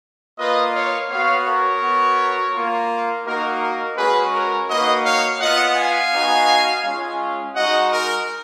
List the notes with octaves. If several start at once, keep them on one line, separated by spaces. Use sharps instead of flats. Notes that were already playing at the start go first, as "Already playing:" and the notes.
A#3 F4 B4 D#5
C#5 F5
B3 F#4 C#5 F5
A#4 C#5
B3 F#4
A#3 F4
A#3 D#4 F#4 A#4
A#4
G#3 C#4 F#4 G#4 B4
A#4 C#5
A#3 D#4 F#4 B4 D#5
C#5 F5
B3 F4 D#5 F#5
F5 G#5
B3 D#4 F#4
G#3 C#4 F4
G#3 D#4 F#4 D#5 F#5
A#4